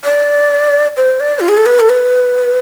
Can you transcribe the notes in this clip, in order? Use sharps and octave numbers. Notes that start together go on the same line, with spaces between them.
D5
C5
D5
F4
G#4
A4
B4
A4
B4